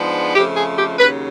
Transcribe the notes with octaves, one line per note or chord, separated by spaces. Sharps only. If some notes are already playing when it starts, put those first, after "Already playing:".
Already playing: G#2 F3 G#3 B3 D4
F2 C#3 F3 A3 G4
G#4
G4
D#2 C#3 F#3 B4